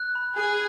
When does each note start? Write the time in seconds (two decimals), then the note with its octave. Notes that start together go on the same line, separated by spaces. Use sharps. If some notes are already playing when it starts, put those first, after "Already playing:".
Already playing: F#6
0.15 B5
0.38 G#4 F#6